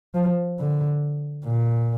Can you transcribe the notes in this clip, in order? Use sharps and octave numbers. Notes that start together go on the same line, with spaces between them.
F3
D3
A#2